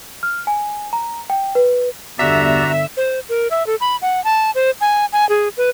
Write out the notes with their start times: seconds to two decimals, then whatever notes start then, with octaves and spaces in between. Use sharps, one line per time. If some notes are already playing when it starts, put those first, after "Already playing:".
0.23 F6
0.47 G#5
0.93 A#5
1.30 G5
1.55 B4
2.19 G1 E2 D3 F#4 G4 D5 E5 A#5
2.97 C5
3.29 A#4
3.51 E5
3.67 A4
3.81 B5
4.02 F#5
4.24 A5
4.55 C5
4.81 G#5
5.13 G#5
5.29 G#4
5.57 B4